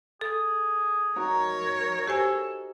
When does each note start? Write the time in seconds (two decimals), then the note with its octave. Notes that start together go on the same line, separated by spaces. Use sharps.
0.21 G#4 A4
1.16 D#4 F#4 A#4 C#5
2.07 G4 A4 C5 G#5